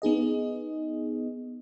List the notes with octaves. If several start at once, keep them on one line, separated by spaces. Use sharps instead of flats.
B3 D#4 G#4 D#5